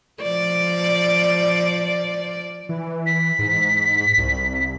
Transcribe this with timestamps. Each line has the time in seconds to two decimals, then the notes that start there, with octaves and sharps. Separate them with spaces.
0.23 F3 D5
2.69 E3
3.06 B6
3.39 G#2
4.18 C2